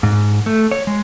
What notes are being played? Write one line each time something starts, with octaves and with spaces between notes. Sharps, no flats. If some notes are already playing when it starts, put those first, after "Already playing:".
G#2
A3
C#5
G#3